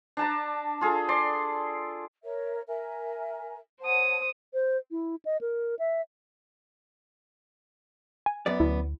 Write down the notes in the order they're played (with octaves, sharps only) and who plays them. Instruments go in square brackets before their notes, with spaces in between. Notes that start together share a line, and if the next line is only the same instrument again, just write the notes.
[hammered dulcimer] D4 A5 A#5
F4 G#4 A4
D5 C6
[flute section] A#4 C#5 E5
A#4 E5 G#5
[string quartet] C5 D#6 [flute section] C#5 F#5 A5
[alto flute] C5
E4
D#5
A#4
E5
[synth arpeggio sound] G#5
[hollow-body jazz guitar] F#2 B3 D5
[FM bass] D2 [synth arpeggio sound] E4